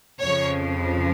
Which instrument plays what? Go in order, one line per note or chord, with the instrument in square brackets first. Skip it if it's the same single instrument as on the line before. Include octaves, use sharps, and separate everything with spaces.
[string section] F2 C#3 F3 C#5